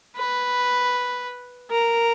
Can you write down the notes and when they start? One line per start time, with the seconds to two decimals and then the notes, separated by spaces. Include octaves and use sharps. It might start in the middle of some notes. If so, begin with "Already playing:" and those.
0.16 B4
1.71 A#4